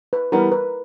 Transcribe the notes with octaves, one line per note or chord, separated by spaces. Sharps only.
B4
E3 G3 B3 A#4
B4